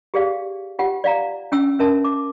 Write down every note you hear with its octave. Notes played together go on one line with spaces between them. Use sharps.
G4 G#4 D5 F5
F4 G4 F#5 G5
D5 F5 A#5
C#4 G5 E6
C#4 A#4 E5 A5
D6